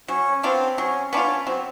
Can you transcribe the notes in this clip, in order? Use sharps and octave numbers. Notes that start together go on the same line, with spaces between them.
F#3 C#4
B3 C4 D4 F4
F#3 C#4
B3 C#4 D4 F4
F#3 C4